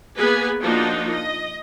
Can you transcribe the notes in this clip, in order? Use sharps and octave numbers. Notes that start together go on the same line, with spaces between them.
A#3 B3 G#4 B4 G#5
F3 A#3 D4 D#4 F4 F#4
D#5